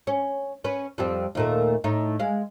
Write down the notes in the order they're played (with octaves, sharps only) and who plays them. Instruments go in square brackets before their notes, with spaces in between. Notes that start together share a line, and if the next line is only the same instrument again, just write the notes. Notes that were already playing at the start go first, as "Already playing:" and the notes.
[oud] C#4
C#4 B4
F2 G3 C4
D#2 A#2 A3
A2 D#4
G#3 F5